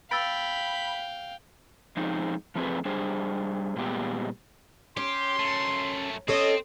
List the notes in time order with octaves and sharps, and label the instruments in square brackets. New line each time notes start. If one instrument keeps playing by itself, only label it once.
[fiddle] F5 [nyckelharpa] G5 [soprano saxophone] B5 [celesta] E6 A6 D7
[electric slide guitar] F3 G#3 C4 D#4
F3 A3 C4 G#4 B4
G3 D4 G#4 C5
A#2 G3 G#3 B3 G4
[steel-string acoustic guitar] C#4 [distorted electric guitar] G4 [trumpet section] C6
[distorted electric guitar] F#2 A3
[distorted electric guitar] C4 [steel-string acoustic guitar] C#4 A4 C#5 [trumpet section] D#5